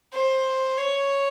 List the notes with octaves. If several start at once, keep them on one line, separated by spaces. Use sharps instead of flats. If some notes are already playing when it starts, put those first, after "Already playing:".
C5
C#5